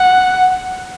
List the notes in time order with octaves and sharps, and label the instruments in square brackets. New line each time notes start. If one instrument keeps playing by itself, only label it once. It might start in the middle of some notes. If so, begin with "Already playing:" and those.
Already playing: [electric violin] F#5